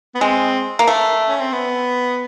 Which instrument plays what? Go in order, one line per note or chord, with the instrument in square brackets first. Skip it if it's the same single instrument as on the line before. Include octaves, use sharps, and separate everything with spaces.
[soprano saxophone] B3
[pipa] G#3 [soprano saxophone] C4
[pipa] A#3
A3
[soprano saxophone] C#4
C4
B3